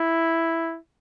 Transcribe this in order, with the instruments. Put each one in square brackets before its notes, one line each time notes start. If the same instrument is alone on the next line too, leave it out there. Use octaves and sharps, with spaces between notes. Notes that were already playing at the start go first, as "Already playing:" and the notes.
Already playing: [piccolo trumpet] E4